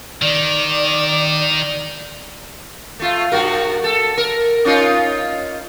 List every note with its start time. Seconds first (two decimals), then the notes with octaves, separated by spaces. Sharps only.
0.22 D#3 D5
3.00 A3 F4
3.32 G2 F#4 A#4
3.84 A4
4.18 A#4
4.65 C#4 D#4 F4